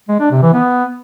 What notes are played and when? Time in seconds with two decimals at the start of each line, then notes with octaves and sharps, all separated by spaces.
0.09 G#3
0.20 D4
0.31 C3
0.42 E3
0.53 B3